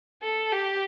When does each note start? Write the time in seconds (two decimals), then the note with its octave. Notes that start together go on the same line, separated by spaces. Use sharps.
0.22 A4
0.52 G4